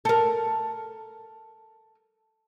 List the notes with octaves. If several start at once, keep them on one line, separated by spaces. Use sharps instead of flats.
A4 A#4